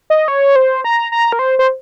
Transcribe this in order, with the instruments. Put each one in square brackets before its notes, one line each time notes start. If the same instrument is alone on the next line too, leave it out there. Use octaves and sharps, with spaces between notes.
[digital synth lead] D#5
C#5
C5
A#5
A#5
A#4
C5
C5